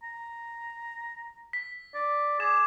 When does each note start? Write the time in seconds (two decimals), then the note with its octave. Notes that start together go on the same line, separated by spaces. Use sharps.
0.03 A#5
1.53 B6
1.94 D5
2.40 G#4 D6 E7